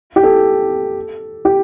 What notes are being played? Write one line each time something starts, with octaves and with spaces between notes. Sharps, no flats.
G4
A4
G4